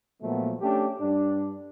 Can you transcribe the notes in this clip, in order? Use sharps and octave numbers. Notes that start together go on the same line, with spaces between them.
A#2 F3 F#3 A3 B3
A3 C#4 D4 G4
G2 D4